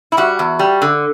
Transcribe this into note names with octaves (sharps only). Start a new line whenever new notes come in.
E4
G3 F#4
E2
G3
D3